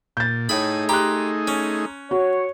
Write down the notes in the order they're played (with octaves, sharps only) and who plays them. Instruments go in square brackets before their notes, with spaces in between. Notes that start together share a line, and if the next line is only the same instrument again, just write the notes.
[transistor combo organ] A#2 [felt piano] G6 A6
[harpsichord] A2 B5 [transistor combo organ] A3 D#4 G#4
[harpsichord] G4 [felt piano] A#5 C6 F#6
[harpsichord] C#4
[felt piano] F#4 [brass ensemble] C#5